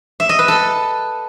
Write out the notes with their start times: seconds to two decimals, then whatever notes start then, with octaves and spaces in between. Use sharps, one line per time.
0.20 E5
0.29 D#5
0.39 B4
0.48 A4